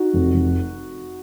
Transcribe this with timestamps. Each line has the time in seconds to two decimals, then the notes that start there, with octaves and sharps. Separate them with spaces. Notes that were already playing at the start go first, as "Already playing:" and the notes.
Already playing: D#4 F#4
0.13 F1
0.34 F1